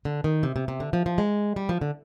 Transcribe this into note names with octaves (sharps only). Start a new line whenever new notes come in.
D3
D#3
C3
C3
C3
D3
F3
F3
G#3
G3
F3
D3